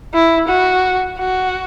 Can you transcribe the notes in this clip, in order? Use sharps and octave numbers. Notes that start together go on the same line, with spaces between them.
E4
F#4
F#4